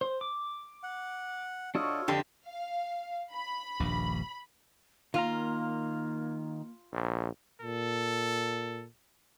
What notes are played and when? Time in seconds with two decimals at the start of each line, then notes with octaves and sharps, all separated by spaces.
0.01 C5
0.21 D6
0.83 F#5
1.75 D4 F4 F#4 A4 C#5 D#5
2.08 F2 D3 D4 G4 A5 C6
2.47 F5
3.33 B5
3.80 D#1 A#1 G2
5.14 D#3 A#3 F4 F5 A#5
6.93 A#1
7.62 A#2 A4